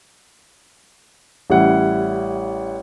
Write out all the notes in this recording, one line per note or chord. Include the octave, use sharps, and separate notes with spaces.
A1 G3 E4 F#5